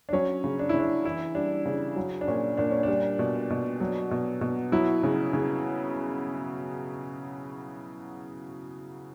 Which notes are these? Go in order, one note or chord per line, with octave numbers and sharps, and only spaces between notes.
D4
F#3 C#4
C#3
D4
C#3 E4
D4
E3 E4
G3 D4
C#3
F#3
D4
A#2 C#4
A#2 D4
C#4
G3 D4
B2
B2
F#3
B2
B2
F#3 E4
C#3
C#3